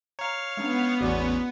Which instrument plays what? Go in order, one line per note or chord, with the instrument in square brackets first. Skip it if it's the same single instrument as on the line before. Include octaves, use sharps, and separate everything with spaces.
[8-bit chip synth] C#5 F5 [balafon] A#5
[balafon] G#3 C#4 D4 [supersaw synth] B3
[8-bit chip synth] A1 E2 C#4 [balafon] F#4 D5 D6